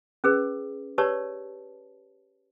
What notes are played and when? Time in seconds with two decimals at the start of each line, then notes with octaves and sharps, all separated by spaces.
0.24 C#4 G#4 B4
0.98 G4 B4 C#5 D5 A5